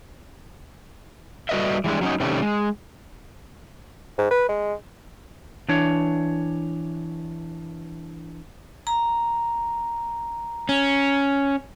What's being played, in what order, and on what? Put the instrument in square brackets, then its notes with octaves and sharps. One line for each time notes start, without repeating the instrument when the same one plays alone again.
[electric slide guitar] G3 F#4 A4 B4 D#5 E5
E3 G3 G#3 D4
F#3 C#4 D#4
C3 D#3 G3 A3 C#4
G#3
[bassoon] G#2
B4
G#3
[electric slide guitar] E3 D4 C#5
[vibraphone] A#5
[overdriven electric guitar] C#4